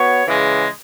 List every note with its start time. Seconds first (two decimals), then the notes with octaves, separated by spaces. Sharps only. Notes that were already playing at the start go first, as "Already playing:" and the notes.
Already playing: B3 F#4 C#5
0.26 C#3 E3 G#3